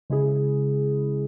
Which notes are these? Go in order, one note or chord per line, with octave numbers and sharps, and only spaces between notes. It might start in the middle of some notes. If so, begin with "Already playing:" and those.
C#3 G#3 E4 G#4